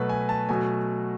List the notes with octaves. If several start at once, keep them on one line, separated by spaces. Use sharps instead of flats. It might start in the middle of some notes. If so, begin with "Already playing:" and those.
Already playing: B2 F#3 A3 B4
G#5
A5
B2 F#3 A3 G#5